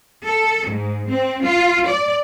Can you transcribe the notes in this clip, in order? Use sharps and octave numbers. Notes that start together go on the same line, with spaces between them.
A4
G#2
C4
F4
D5